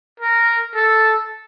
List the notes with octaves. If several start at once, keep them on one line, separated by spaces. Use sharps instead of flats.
A#4
A4